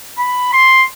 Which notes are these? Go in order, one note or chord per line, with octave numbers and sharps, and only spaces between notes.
B5
C6